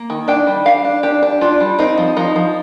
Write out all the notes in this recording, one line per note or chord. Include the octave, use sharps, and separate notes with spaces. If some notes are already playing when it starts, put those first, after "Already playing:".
Already playing: A#3
D#3
D4 G5
G3
D4 F5
D4
D4 G4
D4
D4 F4
G3
C4 D#4
F3
F3 D#4
F3